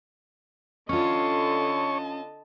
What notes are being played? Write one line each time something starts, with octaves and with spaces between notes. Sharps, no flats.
D3 C#4 F4 C#5 D#5 A5 C#6